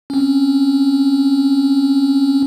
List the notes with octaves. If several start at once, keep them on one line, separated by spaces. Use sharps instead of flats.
C4 C#4